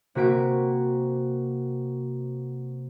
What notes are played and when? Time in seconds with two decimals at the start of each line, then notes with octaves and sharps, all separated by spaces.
0.15 C3 A#3 F#4 B6 D7